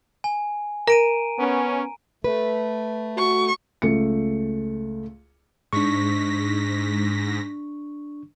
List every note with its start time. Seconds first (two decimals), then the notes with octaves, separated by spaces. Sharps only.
0.24 G#5
0.87 A#4 A#5 D7 D#7
1.39 B3 C#4
2.24 A3 B4
3.17 F#4 C#6
3.82 C#2 A3 C#7
5.73 G#2 D4 C#6 A#6 B6